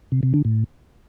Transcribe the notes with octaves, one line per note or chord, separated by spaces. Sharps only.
C3
C3
D3
A2